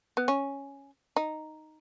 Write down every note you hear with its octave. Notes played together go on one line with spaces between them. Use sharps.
B3
C#4
D#4